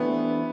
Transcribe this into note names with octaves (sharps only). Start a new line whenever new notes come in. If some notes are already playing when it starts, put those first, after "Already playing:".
Already playing: E3 A3 B3 D4 G4 C5